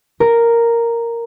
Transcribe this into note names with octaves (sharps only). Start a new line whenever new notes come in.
A#4